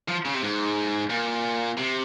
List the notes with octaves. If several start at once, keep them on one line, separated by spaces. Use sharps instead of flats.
F3
C#3
C3
G#2
A#2
C3